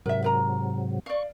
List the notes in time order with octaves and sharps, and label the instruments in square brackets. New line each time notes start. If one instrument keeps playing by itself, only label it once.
[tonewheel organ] G#2 C3 F#3 [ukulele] A#4 E5
[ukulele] A#4 A#5
[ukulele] D5 F5 [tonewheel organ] C#6